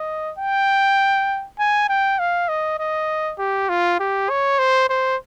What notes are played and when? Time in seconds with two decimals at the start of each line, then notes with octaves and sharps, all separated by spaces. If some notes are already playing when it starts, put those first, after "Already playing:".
Already playing: D#5
0.38 G5
1.59 G#5
1.89 G5
2.19 F5
2.49 D#5
2.79 D#5
3.39 G4
3.69 F4
4.00 G4
4.30 C#5
4.59 C5
4.89 C5